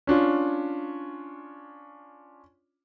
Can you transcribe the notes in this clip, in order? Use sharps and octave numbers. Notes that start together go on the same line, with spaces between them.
C#4 D4 F4